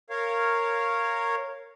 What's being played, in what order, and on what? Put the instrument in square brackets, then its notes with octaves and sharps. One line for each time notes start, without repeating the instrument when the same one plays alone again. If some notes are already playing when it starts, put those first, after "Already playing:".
[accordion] A#4 C#5 F5